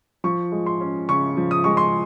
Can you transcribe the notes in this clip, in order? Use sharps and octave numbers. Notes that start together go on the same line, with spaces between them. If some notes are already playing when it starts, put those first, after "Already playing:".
F3 C#6
G#3
C6
C#4
C#3 C#6
F3
D#6
G#3 C#6
C6